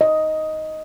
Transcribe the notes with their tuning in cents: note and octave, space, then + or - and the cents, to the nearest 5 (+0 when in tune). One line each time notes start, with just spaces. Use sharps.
D#5 +5